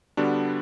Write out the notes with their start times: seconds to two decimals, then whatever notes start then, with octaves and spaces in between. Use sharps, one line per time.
0.17 D3 G3 B3 D4 F#4